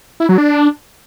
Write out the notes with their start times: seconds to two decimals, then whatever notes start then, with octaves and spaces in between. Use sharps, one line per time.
0.20 E4
0.29 F#3
0.38 D4